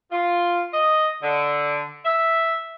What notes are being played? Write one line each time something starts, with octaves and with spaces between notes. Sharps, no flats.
F4
D#5
D3
E5